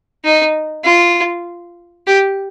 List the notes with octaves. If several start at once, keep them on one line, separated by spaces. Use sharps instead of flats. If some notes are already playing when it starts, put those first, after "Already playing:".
D#4
F4
G4